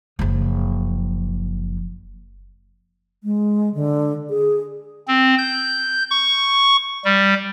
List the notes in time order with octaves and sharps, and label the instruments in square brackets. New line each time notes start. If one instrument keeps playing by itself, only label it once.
[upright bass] F#1 F3
[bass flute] G#3
D3
G#4
[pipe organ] C4
G6
C#6
G3